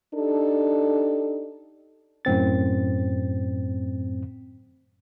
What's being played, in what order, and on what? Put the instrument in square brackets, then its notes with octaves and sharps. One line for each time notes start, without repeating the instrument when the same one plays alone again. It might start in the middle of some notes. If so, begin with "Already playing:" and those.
[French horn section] D4 D#4 G4 A4
[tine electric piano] F#2 A2 C4 A6